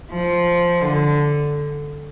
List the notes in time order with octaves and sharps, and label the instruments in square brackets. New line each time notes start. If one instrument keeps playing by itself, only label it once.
[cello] F3
D3